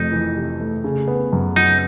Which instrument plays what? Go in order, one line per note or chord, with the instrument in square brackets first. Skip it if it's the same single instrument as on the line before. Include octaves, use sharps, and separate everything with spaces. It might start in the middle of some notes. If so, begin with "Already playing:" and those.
Already playing: [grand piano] F2 C3 A3 [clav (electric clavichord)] D#4
[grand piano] E3
C3
A3
C#3
B3
F#2
[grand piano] F#3 [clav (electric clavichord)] D#4